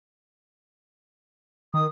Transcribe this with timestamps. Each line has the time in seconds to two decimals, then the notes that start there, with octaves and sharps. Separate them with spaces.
1.74 D#3 D#6